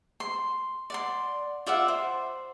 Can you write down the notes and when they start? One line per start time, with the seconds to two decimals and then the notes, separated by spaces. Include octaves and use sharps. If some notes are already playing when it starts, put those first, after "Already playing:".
0.20 C6
0.90 D5 F#5 C6
1.66 F4 D5 E5 F#5
1.88 C5